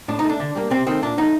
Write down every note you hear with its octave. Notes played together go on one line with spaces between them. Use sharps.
A2 D4
D#4
A3
D4
D3
G3 A#3
C3 C4
D#3 A3 C4
A#2 D4
F#3 A3 D#4